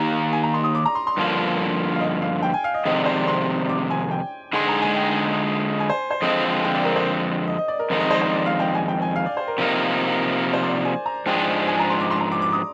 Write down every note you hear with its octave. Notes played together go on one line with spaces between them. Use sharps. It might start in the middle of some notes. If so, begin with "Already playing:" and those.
Already playing: D#3 A#3 D#4 G4 A#5
G#5
A#5
C6
D#6
D6
A#5
C6
C6
G2 D3 F3 A#3
F5
D#5
F5
G5
G#5
F5
D#5
F2 C3 D#3 G#3 D#5
D5
C5
D5
C6
D6
G#5
G5
D3 G#3 D#4 G#4 C6
A#5
G#5
G5
G#5
C5
C5
F2 D3 G#3 C4 F4 D#5
G5
D5
A#4
C5
D#5
D#5
D5
A#4
F2 D#3 G#3 D#4 A#4
D#5
C5
C5
D5
F5
G5
G#5
G5
G#5
F5
D5
C5
A#4
C3 F3 A#3 D#4
C5
D5
D5
G#5
A#5
G#2 F3 G#3 D4 G#4 G5
G#5
A#5
C6
D6
C6
A#5
D6
D6
D#6